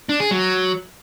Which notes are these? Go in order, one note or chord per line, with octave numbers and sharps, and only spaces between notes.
D4
G#4
F#3